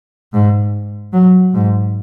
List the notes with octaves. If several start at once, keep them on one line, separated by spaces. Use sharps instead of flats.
G#2
F#3
G#2